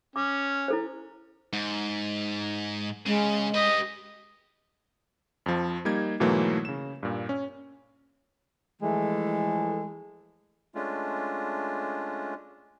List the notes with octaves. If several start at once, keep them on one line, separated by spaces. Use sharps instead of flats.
C#4 D6
E4 A4 C5
G#2
C#3 G#3
G4 B4 D#5
F2 F3
G3 A#3 D#4 G#6
G#2 B2 E3 F#3 A3 A#3
C#3 E7
G2 A#2
C#4
E3 F3 G#3 A3
G#3 A3 C#4 D4 F4